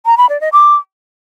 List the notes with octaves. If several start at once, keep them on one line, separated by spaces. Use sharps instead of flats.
A#5
B5
D5
D#5
D6